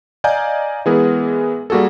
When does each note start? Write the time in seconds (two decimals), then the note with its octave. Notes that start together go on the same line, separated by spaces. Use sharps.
0.24 D5 D#5 F5 G#5 A#5 G6
0.86 E3 G#3 B3 G#4 A#4
1.70 G3 A#3 F#4 G#4 A4